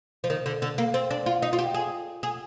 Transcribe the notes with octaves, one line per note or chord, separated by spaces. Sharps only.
F3
D#3
D3
D3
A#3
C4
D4
F4
D#4
F4
G4
G#4
G#4